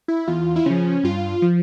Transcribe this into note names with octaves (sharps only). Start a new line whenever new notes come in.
E4
E2 F4
E4
C#3 F3 C#4
G2 F4
F3